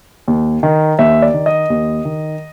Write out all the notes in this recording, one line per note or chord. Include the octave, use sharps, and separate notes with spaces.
D#2
D#3
D#2 E5
D5
D#3
D#5
D#2
D#3